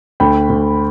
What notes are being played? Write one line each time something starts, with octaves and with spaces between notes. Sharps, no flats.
D2 G5 B5
D2